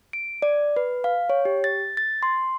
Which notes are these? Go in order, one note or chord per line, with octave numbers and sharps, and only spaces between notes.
D7
D5
B4
F5
C#5
G4
A6
A6
C6